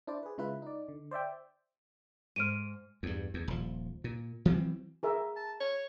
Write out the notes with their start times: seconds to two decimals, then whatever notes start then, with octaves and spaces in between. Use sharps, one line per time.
0.07 D4 E4 C5 D5
0.23 G#4 B4
0.38 C#3 G#3 E4 F4 B4
0.62 D#4 D5
0.89 D3
1.11 C5 D5 E5 G5
2.36 G#2 C5 F6 D7 D#7
3.03 E2 G2
3.34 E2
3.48 D#1 F3
4.04 A#2
4.45 E3 F#3 A3 C4
5.03 G#4 A#4 E5
5.36 A5
5.60 C#5